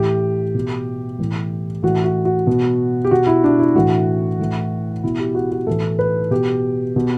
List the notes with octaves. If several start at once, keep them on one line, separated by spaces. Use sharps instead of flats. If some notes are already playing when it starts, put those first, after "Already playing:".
Already playing: A2 E3 G4
B2
A2 E3
A2 E3 F#4
F#4
F#4
B2
G4
B2 F#4
E4
D4
E4
A2 E3 F#4
A2 E3
B2 E4
G4
F#4
F#4
A2 E3 A4
B4
B2 G4
B2